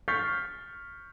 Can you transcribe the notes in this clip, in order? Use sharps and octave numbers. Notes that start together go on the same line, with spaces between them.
C#6 F6 G6 A6 B6 C7